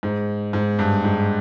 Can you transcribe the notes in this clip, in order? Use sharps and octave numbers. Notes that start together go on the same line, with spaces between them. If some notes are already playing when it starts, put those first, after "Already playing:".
G#2
G#2
G2
G#2